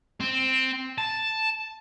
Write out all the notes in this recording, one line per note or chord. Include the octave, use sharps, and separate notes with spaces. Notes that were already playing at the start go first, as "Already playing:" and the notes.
C4
A5